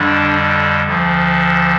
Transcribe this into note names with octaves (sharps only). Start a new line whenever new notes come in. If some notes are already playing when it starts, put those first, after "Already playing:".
Already playing: F2 D3 G3 D4
D2 D3 F3